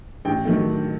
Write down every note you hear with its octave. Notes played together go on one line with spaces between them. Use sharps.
A1 G5
D#3 F#3 A3